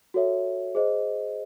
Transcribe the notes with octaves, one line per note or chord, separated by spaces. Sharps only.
F#4 A4 C#5 E5
G#4 C5 D#5